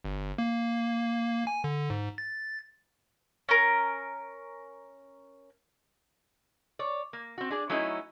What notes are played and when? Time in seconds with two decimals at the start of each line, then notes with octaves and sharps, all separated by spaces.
0.05 G1
0.38 A#3
1.47 G#5
1.64 D3
1.90 G#2
2.18 A6
3.49 C#4 A#4
6.79 C#5 D5
7.13 A#3
7.38 C4 F#4
7.50 D4 G#4 D5
7.70 F#3 A3 C#4 D#4 E4